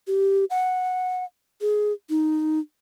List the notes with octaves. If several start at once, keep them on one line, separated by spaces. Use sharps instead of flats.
G4
F#5
G#4
D#4